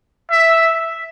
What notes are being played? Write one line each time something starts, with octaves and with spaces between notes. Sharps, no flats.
E5